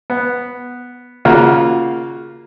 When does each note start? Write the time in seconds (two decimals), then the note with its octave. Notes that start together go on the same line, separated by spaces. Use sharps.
0.10 B3
1.25 C#3 A#3 F4 F#4